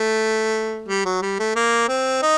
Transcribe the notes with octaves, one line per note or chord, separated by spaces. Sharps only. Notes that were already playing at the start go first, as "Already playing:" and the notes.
Already playing: A3
G3
F#3
G3
A3
A#3
C4
D#4